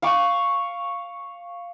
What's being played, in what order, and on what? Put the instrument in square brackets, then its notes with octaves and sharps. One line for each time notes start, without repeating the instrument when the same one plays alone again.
[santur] F5 C#6 D6